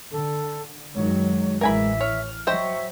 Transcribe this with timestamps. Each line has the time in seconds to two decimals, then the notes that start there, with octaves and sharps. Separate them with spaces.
0.12 D3 A4
0.95 F#2 D#3 F#3 G#3 C#5
1.61 A1 E3 G#3 A#4 E5 G#5 B5
2.01 C#5 F6
2.47 F#3 C5 D#5 E5 G5 C#6